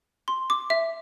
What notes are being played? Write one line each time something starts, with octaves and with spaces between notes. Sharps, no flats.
C6
D6
E5